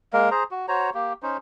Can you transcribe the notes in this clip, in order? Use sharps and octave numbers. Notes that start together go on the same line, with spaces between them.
G#3 A#3 A#4
G#4 C5 A#5
F#4
F#4 C5 C#5 A#5
A#3 G4
C#4 D#4 C5